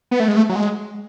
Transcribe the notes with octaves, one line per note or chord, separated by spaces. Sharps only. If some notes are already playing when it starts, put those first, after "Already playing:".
B3
A3
G#3
A3
F#3
G#3